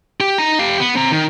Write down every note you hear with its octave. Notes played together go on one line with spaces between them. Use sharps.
G4
D#4 A#5
G4 F5
B3
C4 A#5
D#3